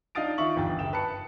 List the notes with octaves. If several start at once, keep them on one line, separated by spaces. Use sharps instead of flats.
D4 D#4 F5 D#6 A6 D7
D#3 F4 E5 C#6 F#7
G1 E2 G5 A6
F#1 G5 E7
B4 A5 C#7